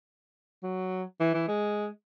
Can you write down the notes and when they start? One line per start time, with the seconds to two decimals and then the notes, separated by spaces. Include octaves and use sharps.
0.63 F#3
1.20 E3
1.34 E3
1.48 G#3